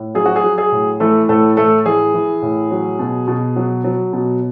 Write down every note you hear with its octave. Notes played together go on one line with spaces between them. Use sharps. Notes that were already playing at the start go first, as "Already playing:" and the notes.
Already playing: A2
F#3 G#4
F#4
G#4
F#3
G#4
A2
E3 A3 A4
A2 A3 A4
A2 A3 A4
E3 G#4
E3
A2
F#3
B2
B2
F#3
F#3
B2